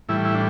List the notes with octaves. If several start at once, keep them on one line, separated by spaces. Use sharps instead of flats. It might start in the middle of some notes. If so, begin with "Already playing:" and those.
A2 E3 G3 E4
E4
D4